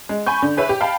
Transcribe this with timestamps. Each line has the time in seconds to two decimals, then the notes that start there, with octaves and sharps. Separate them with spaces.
0.09 G#3
0.26 G#5 B5 C#6 G6
0.42 D3
0.57 G#4 B4 C#5 E5
0.69 G4
0.81 F5 G5 A5 B5